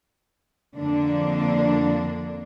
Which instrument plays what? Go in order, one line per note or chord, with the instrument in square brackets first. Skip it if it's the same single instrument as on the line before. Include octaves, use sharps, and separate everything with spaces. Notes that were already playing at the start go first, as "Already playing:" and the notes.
[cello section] F2 D3 A#3 D4